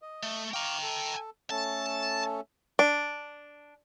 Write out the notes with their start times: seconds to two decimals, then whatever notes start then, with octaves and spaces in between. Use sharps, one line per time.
0.02 D#5
0.23 A3
0.54 F5 G5 A#5 C#6 D6
0.82 A4
1.50 A3 C#4 A4 A5
2.79 D4